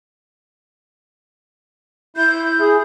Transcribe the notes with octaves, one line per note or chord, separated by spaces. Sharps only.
E4 G6
G#4